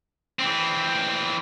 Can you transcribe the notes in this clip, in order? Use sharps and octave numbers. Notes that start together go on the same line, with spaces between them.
E3 C4